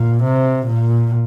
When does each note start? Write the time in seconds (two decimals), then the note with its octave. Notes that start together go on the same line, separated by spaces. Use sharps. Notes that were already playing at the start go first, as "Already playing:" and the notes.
Already playing: A#2
0.24 C3
0.67 A#2